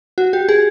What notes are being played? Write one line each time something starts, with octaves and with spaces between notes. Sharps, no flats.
F#4
G4
G#4